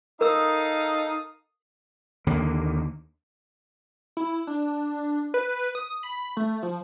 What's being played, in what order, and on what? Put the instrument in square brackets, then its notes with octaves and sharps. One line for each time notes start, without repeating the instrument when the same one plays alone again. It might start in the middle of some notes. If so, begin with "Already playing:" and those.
[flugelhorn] D#4 [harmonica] A4 F5 D#6 [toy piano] A#4 E6
[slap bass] D#2 D3 A#3
[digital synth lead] E4
D4
B4
D#6
B5
A3
F3